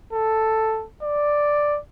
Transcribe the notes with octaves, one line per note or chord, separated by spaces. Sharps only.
A4
D5